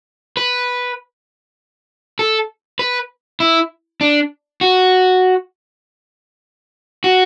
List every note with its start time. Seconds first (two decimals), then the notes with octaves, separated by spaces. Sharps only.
0.37 B4
2.19 A4
2.79 B4
3.40 E4
4.01 D4
4.61 F#4
7.04 F#4